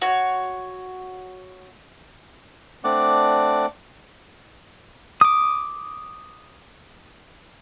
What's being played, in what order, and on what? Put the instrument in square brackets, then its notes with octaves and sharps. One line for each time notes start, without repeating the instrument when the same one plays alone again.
[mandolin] F#4 C#5
[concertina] A3 C4 D4 D5 F#5 D6
[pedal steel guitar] D6 D#6